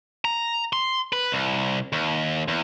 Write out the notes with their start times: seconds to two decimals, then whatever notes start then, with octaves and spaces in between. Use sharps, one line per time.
0.25 A#5
0.73 C6
1.13 B4
1.32 C2
1.93 D#2
2.48 E2